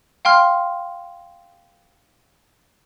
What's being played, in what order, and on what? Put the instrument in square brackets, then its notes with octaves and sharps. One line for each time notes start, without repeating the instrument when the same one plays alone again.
[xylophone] F5 G5 C6 F6